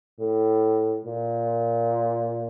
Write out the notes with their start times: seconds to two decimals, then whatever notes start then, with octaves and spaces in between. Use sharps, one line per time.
0.20 A2
1.06 A#2